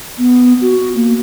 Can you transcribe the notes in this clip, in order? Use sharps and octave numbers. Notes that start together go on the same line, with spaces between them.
B3
F#4
A#3